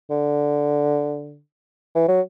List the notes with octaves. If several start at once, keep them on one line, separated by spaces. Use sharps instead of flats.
D3
E3
F#3